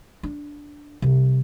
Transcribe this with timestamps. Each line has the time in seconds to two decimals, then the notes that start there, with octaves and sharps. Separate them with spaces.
0.23 D4
1.02 C3 G3